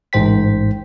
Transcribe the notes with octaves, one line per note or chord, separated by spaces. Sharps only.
A1 G#2 C5 G5 B6